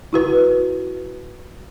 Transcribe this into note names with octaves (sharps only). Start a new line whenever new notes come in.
E4 F#4 B4